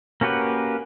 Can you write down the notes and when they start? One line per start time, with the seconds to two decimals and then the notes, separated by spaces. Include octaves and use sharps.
0.21 A#3 C#4 F#4 G4 B4